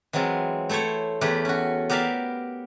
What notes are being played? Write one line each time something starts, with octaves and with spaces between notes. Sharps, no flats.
E3 F#3 G#3 C4 F4
A3 E4 A4 C5 C#5
E2 A3 E4 G4 A#4 B4
C#4 F#4
B3 G4 A#4 D5 E5 F5